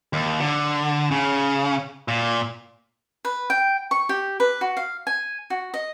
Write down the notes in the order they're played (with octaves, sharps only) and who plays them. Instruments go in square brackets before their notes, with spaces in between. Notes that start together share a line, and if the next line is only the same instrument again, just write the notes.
[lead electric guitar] D#2
D3
C#3
A#2
[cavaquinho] B4
G5
C#6
G4
B4
F#4
F5
G#5
F#4
D#5